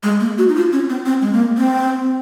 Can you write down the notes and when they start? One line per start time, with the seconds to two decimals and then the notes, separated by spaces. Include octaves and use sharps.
0.03 G#3
0.20 A#3
0.38 F#4
0.49 D#4
0.55 F4
0.73 C#4
0.90 C4
1.06 C4
1.22 G#3
1.33 A#3
1.58 C4